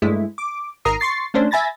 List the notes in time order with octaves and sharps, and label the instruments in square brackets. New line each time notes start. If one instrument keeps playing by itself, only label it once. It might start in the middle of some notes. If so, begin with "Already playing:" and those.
[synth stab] G2 G#3 A3 E4
D6
G#1 A#4 A#5 D#6 C7
C6 C#6 A6 C7
A3 C#4 D4 C5
E5 G#5 B5 A6 A#6